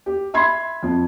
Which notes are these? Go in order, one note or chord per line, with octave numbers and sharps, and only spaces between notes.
G4
E5 B5 C6 G#6 C7
F2